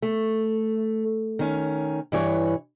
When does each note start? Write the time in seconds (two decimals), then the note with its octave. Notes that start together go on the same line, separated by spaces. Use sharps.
0.02 A3
1.39 D#3 C#4
2.12 G2 E3 C#5